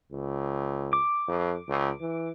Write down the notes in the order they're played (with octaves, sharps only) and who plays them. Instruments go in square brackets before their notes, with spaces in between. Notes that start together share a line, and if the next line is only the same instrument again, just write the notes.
[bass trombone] C#2
[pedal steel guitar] D6
[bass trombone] F2
C#2
E3